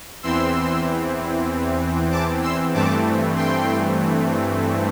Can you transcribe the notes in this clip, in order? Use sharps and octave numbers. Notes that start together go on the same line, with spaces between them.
E2 E3 C4 C6 E6
A5 D6
C6 E6
G2 E3 A3 C4 A5 D6
G5 C6